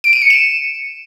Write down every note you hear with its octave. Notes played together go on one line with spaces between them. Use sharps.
D7
D#7
C#7
E7